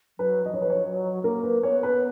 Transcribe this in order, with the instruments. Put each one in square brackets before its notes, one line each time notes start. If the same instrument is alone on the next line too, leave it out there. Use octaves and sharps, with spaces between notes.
[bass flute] F#3 [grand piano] B4
[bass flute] F3 [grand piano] D#5
[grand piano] C#5
B4
C#5
[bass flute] F#3
[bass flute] A#3 [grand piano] A#4
[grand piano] B4
[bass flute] B3 [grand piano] C#5
[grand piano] B4